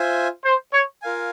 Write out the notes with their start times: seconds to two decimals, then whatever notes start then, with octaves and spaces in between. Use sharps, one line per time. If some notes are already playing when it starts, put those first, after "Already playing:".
Already playing: F4 C5 E5 G#5
0.45 C5
0.74 C#5
1.02 F4 A#4 F5 G#5